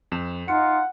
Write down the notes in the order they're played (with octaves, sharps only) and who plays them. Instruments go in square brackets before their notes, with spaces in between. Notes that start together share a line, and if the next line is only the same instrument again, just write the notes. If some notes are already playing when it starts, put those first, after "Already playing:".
[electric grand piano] F2 E7
[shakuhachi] D#4 [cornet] F4 [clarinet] F#5 [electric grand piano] C#7